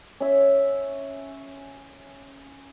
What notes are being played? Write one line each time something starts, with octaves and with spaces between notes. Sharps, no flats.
C#4 E5